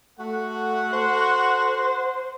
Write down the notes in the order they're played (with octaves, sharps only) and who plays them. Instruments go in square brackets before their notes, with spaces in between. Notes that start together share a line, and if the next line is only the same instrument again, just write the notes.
[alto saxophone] A3 [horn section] F#4 A4 F#5
[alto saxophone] C5